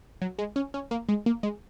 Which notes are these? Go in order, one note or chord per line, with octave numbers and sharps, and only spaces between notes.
F#3
G#3
C#4
C#4
A#3
G#3
A#3
G#3